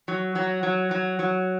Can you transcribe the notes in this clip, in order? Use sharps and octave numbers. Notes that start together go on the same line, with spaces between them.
F#3
F#3
F#3
F#3
F#3